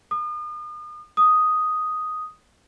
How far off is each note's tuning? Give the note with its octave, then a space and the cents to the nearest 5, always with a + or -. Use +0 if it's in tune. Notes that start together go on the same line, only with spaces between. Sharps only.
D#6 -40
D#6 +0